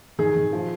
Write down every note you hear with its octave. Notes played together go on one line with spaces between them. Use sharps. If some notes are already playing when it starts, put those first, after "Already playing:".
D#3 G#4
D#3
F3